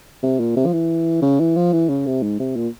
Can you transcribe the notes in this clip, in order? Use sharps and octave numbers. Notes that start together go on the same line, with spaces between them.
C3
A#2
C3
F3
E3
C#3
E3
F3
E3
C#3
C3
G#2
C3
A#2